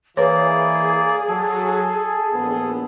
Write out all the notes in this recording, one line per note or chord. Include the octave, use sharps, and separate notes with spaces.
E3 A#3 G#4 B4 C#5 D5
F#3 A4
A#1 D#2 B3